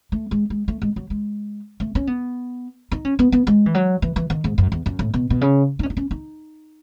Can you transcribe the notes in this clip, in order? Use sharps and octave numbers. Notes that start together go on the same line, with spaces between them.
A3
G#3
G#3
A3
G#3
F#3
G#3
A3
C#4
B3
D#4
C#4
B3
B3
G#3
E3
F#3
E3
E3
D#3
G#2
F#2
E2
F#2
A2
B2
B2
C#3
D#4
C#4
D#4
C#4
D#4